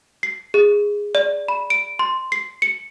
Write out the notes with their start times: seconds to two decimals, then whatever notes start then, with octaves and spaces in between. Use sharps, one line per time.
0.23 C7
0.54 G#4
1.15 D5
1.48 B5
1.70 D7
1.99 C6
2.32 C7
2.62 C#7